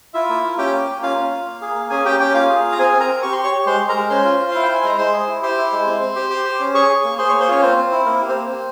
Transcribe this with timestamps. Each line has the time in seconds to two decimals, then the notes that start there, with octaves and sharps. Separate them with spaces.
0.14 E4 F4 E5
0.29 A#3
0.43 F4
0.58 C#4 G4 G5
0.73 A#3
0.88 A#3
1.02 C#4 F4 F5
1.17 C#4
1.32 F4
1.46 A#3
1.61 G#4
1.75 A#3
1.90 C#4 G#4 G#5
2.05 C#4 G4 G5
2.19 C#4 G4 G5
2.34 A#3 F4 F5
2.49 G#4
2.64 F4
2.72 A#5
2.79 C4 G#4 G#5
2.93 C4
3.00 A#4 A#5
3.08 C4
3.22 G4 C#6
3.33 G4 C6
3.43 C#5 C#6
3.52 G4
3.66 G#3 C5 C6
3.81 G#3
3.89 A#4 A#5
3.96 G#3
4.10 C#4 C5 C6
4.25 F4
4.39 F4
4.51 E4 F5
4.63 G5
4.69 E4
4.75 G#5
4.84 G#3 A#5
4.98 G#3 C5 C6
5.13 G#4
5.27 E4
5.43 G4 C5 C6
5.58 E4
5.72 G#3
5.87 C4
6.01 C4
6.16 G4
6.30 G4
6.45 G4
6.60 C#4
6.74 G#4 C#5 C#6
6.89 G#4
7.04 A#3
7.18 G#4 C5 C6
7.29 A#3 C#5 C#6
7.40 C5 C6
7.48 C#4 F4 C#5
7.62 C4 C5
7.77 C4
7.92 E4
8.06 A#3 A#4
8.22 G4
8.28 C4 C5
8.35 A#3
8.51 C4